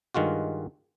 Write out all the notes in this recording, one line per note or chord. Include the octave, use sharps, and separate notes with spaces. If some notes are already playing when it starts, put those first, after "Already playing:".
G2 D#3 G#3 F4 F#4